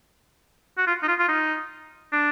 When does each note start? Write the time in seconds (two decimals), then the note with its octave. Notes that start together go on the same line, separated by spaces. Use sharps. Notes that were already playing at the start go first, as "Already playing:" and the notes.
0.78 F#4
0.87 F4
1.03 D#4
1.08 F4
1.19 F4
1.28 D#4
2.12 D4